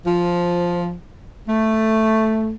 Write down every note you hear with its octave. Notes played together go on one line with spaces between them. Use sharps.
F3
A3